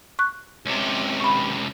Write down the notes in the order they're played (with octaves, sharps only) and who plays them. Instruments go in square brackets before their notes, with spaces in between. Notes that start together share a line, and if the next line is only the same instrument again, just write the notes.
[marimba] C#6 F#6
[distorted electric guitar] C#2 C3
[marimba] B5 C#6